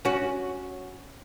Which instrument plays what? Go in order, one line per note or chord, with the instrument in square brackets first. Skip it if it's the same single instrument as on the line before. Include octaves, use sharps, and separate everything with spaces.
[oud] C#4 F#4